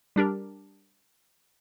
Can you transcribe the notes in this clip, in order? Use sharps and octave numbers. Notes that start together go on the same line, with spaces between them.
G3 D4 G4 A#4